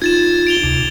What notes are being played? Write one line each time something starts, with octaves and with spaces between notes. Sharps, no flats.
D#4 F4 G#6 A6 E7
D7 F7 G7
D2 C3